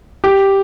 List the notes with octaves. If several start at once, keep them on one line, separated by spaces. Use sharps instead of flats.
G4